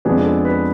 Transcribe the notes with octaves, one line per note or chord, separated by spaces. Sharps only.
F2 F3 G#3 B3 D4 G#4
A4
B4